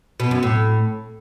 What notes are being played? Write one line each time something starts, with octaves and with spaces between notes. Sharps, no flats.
B2
F#2
A2